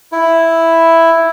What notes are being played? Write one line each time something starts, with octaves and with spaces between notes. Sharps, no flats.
E4